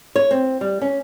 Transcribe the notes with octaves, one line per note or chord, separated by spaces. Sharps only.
C#5
C4
G3
C#4